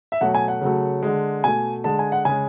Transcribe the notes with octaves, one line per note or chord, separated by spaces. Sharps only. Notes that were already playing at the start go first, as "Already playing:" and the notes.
E5
B2 F#3 A3 F#5
G#5
F#5
C#3 F#3 A3
D3 G#3
B2 A3 G#5
D3 G#3 A5
G#5
F#5
C#3 G#3 G#5